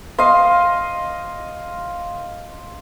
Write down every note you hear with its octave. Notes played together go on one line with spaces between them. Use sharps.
D#5 F5 C6